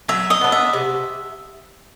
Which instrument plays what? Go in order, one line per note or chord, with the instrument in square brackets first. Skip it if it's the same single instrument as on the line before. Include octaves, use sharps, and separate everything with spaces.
[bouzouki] F#3 [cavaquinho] E5
[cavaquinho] D#5
[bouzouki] B3 D4
[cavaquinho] E5
[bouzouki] C3